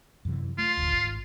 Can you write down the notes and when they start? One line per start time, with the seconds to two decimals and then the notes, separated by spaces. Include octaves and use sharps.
0.25 F#2 C3 E3
0.58 A3 F4
0.77 D1 G1 D2
0.91 G#1